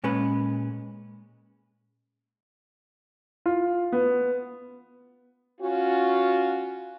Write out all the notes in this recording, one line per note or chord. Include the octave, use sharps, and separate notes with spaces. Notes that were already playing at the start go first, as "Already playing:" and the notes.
A#2 G#3 C#4 B4
F4
B3
C#4 F4 F#4